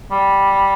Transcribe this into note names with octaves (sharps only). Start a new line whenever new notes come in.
G3